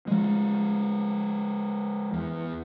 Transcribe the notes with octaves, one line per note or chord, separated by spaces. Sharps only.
F3 G#3
E2